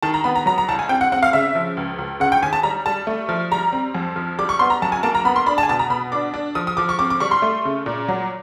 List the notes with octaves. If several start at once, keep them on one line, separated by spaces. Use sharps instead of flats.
D#3 A5
A#5
B3 B5
A#5
F#3 A#5
A#5
C2 A5
G#5
C4 G5
F#5
C4 F#5
F5
C#3 E5
F3
C#2
C#2
C#3 F#5
G5
D#2 G#5
A5
G3 A#5
G3 A5
A3
F3
G3 A#5
C4
F2
F3
G3 D6
C#6
B3 C6
A#5
F#2 A5
G#5
A#3 A5
A#5
B3 B5
C6
D4 B5
A5
G#5
B2 A5
A#5
B2 B5
D4 D6
D4
F3 D#6
D#6
F3 D6
C#6
C4 D6
D6
G3 C#6
C6
A3
C#3
A#2
F#3